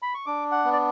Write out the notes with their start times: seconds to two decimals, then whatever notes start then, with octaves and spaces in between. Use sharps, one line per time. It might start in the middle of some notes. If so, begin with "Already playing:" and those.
0.02 B5
0.14 C#6
0.26 D4 D6
0.51 F#5
0.64 B3
0.73 D5